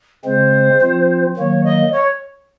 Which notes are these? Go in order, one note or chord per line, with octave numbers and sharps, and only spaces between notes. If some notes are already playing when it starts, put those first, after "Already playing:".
C#3 G#3 C4 C5
F3 C4 F4
D#3 F#3 A#3 C#5
D#5
C#5